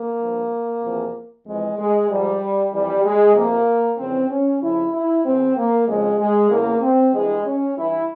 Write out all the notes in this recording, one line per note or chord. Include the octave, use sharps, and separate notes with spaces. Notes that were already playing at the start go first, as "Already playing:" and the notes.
Already playing: A#3
G2 F3
E2 C3 F3
F2 E3 G#3
G#3
G#2 F3 G3
F2 E3 G3
G#3
F2 C3 F3 A#3
F2 C#3 E3 C4
C#4
F2 C#3 F3 E4
E4
E2 E3 C4
A#3
F2 C#3 F3 G#3
G#3
E2 C#3 E3 A#3
C4
G2 E3 G#3
C#4
G2 E3 E4